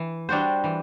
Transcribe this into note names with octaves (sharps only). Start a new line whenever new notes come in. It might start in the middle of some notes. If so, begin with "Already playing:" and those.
Already playing: E3
G3 D4 F#4 C5
E3